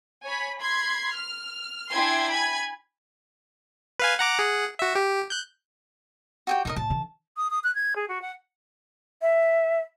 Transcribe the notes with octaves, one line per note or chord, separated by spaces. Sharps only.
C#5 G#5 B5
B5 C6 G#6 C7
F6
D4 E4 G5 G#5 C6 G#6
G#5 B5 G#6
B4 F5 G#5
F#5 A#5 D6
G#4 F#5
F#4 E5
G4
F#6 G6
F#4 G4 G5
A2 D#4 A#4 D#5
A2 A5
D3 E3
D#6
D#6
F#6
G#6
G#4
F#4
F#5
E5